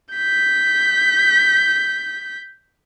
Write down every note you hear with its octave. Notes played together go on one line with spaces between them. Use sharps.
G6 B6